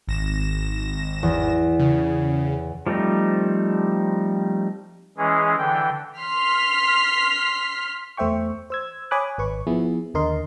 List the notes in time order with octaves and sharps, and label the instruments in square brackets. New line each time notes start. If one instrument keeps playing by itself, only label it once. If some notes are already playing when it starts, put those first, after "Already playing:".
[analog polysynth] G#1 A#6 E7
[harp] E2
[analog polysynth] C#3
[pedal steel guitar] F3 G3 A3 C4 D#4
[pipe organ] E3 G#3 C#4 G#4
D3 E3 G5
[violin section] C6 F6 B6 C7
[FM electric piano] E2 A3 C5 E5 G5 C#6
C5 E6 G#6
C#5 G#5 B5 D6 D#6 F#6
G#1 B4 C#6
F3 B3 E4 G#4
D#2 D3 A#4 D#5 C6